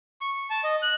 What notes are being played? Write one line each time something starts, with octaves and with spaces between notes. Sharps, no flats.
C#6
A5
D#5
F#6